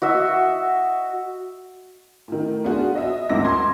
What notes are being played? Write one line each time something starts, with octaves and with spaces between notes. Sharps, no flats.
F#4 D#5 E5
A2 D#3
B3 D4 F4 F#4 G#4
D#5 E5
D2 G#2 D#3 D6 E6 A#6
F4 C6 G#6